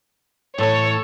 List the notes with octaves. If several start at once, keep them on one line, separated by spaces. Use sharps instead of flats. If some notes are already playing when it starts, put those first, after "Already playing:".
A2 E3 A4 C#5